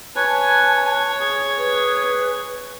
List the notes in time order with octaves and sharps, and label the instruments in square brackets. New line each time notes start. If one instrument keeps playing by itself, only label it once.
[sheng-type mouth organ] B4 G#5 [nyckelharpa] C#5 [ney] A5
[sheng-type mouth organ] G#4
[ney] B4